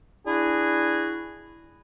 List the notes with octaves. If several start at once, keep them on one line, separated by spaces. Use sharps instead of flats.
D4 E4 F#4 G#4